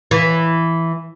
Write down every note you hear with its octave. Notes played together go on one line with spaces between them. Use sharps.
E3